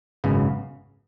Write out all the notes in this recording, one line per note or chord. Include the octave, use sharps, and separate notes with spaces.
G#1 F#2 C#3 F#3 B3